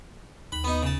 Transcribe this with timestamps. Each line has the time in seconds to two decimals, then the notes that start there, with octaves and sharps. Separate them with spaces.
0.52 D#2 B5
0.64 B3 D#4
0.82 C#3 A5